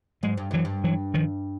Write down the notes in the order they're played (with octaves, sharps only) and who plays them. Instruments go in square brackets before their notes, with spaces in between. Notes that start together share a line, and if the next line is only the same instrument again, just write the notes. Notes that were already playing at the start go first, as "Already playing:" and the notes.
[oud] G#2 [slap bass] F#3 G#3
[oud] G2
[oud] F#2 [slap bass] E3 F#3
[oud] G2
[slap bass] E3 F#3
D#3 F3